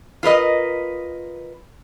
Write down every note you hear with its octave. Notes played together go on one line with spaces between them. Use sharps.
F4 A#4 B4 D#5